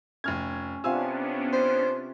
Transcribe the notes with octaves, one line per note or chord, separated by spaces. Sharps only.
F1 C#4 F6 G#6
C3 B3 C#4 D4 F4 F5 G#5 E6
C5